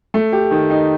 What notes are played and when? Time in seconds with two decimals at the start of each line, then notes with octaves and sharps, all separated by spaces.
0.14 A3
0.32 G4
0.51 D#3
0.70 D#4